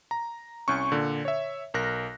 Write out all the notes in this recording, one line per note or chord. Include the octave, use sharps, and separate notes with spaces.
A#5
C2 C#4 C#6
A#2 D3
C#5 E5
B1 A#4 F#6 A#6